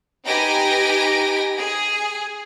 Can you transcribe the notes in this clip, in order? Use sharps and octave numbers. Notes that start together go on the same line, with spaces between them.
D#4 G4 B4 G#5 A#6 D7
G#4